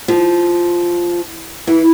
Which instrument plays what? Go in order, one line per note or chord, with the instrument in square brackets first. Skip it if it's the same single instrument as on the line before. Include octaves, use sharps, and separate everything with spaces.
[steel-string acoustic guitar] F3
E3